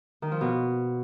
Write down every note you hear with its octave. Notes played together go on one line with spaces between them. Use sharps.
D#3
F3
B2